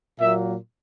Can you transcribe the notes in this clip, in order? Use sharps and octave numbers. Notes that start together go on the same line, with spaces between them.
A#2 F#3 A#3 E5